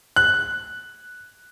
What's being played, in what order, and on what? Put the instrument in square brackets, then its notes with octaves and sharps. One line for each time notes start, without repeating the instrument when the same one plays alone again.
[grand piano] F#6